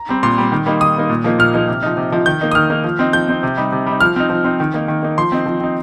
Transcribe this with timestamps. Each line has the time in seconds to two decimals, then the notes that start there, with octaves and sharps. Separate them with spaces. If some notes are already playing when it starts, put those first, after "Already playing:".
Already playing: A#5
0.09 G3 C4
0.23 A#2 C6
0.38 G3 C4
0.52 D#3
0.66 G3 A#3 D#4
0.81 D#3 D#6
0.96 G3 A#3 D#4
1.09 A#2
1.24 F3 A#3 D#4
1.39 A#2 F6
1.54 F3 A#3 D#4
1.68 C3
1.83 F3 D#4
1.97 C3
2.12 F3 D#4
2.26 D#3 G6
2.41 A#3 D#4
2.52 D#6
2.55 D#3 F6
2.70 A#3 D#4
2.84 F3
2.99 C4 D#4
3.13 F3 G6
3.29 C4 D#4
3.43 C3
3.57 G3 D#4
3.72 C3
3.86 G3 D#4
4.01 F3 F6
4.16 C4 D#4
4.30 F3
4.44 C4 D#4
4.60 D#3
4.74 A#3 D#4
4.88 D#3
5.03 A#3 D#4
5.18 F3 C6
5.32 C4 D#4
5.46 F3
5.61 C4 D#4